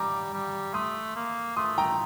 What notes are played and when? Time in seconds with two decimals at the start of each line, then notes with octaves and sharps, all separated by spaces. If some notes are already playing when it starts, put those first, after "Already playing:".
Already playing: G3 A#5 D6
0.33 G3
0.74 A3 C6 D#6
1.16 A#3
1.56 A3 C6 D#6
1.78 G5 A#5